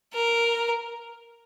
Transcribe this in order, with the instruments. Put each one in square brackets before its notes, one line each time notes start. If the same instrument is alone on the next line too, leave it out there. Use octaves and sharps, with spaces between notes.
[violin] A#4